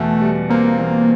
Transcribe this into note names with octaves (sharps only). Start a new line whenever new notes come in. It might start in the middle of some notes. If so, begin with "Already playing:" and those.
Already playing: E2 B2 A3
G3
A#3 C4
E2